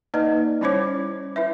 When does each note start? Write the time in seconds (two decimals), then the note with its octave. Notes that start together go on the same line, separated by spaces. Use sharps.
0.14 A#3 D#4 B4 D5 D#5
0.61 G3 C#4 E4 C5 C#5 D6
1.36 E4 B4 E5